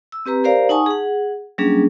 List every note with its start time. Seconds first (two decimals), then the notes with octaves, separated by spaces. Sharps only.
0.12 E6
0.26 C4 G4 B4 A#5
0.44 G4 A#4 C5 D5 F5 A#5
0.69 D#4 F#5 G#5 A5 C#6 D#6
0.86 G#4 F#5
1.58 F#3 G3 A#3 C#4 D4 G#4